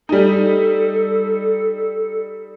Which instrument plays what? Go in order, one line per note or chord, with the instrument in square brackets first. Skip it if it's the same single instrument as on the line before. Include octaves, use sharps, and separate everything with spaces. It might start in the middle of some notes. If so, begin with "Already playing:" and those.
[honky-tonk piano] G3 D#4 [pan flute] A4